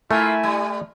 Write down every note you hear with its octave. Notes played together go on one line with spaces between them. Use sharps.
A3 A#3 E4 F4 A#4 G#5
G3